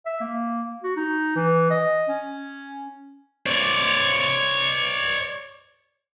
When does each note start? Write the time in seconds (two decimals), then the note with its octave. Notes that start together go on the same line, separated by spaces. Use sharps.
0.06 E5
0.21 A#3
0.84 F#4
0.96 D#4
1.36 E3
1.71 D#5
2.09 C#4
3.46 C#5 D5